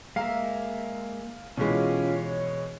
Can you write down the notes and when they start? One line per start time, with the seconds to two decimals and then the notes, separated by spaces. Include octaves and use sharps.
0.16 G#3 A#3 E5 F5 A#5
1.57 B2 E3 G#3 C#4 F4 G4
2.16 C#5